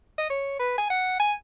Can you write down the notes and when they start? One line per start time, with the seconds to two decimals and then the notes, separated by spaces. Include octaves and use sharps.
0.18 D#5
0.30 C#5
0.59 B4
0.78 G#5
0.90 F#5
1.20 G#5